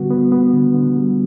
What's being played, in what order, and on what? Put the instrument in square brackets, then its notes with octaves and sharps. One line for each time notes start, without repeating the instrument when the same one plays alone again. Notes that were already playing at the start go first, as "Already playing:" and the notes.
Already playing: [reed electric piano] D3 G3 B3 F#4
B3
B3
D3
D3
G3